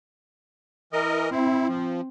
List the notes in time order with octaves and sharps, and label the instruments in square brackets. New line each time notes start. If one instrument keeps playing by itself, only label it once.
[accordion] E3 A#4 D#5
[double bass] C4 [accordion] E4
[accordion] F3